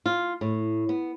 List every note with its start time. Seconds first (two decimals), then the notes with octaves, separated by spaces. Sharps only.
0.06 F4
0.41 A2
0.89 B3